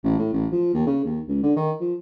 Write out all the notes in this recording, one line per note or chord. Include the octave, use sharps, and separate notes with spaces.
A1
A2
A1
F3
D#2
C#3
D#2
C#2
D3
D#3
F3